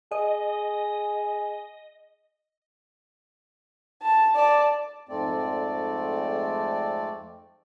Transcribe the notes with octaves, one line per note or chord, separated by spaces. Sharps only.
G#4 D#5
A5
D5 A5
F2 G#2 A3 C4 D5